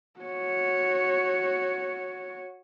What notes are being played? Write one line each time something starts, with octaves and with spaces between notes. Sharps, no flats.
F#4 C#5